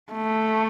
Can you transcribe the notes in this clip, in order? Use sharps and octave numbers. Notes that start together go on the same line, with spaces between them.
A3